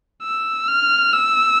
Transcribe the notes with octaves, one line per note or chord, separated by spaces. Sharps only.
E6
F6
E6